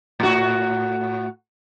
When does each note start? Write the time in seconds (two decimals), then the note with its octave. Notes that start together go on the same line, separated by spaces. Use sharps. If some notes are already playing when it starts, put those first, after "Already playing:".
0.20 A2 F#4